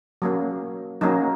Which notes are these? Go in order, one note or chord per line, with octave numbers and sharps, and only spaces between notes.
F#3 A#3 C#4
F#3 A#3 C#4 D#4